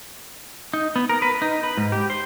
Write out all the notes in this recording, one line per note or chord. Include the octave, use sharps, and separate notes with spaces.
D#4
B3
A#4
B4
D#4
B4
G#2
G4
C5